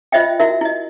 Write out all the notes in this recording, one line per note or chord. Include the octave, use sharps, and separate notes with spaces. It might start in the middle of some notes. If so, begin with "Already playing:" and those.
F4 C5 D#5 E5 G5
E4 F#4 A#4 E5
E4 D#5